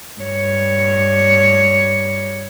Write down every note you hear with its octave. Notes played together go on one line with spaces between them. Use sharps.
G2 C#5